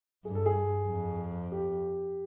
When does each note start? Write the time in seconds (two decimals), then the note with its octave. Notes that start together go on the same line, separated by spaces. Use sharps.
0.25 G2 G#4
0.35 A4
0.46 G#4
0.88 F2
1.52 G4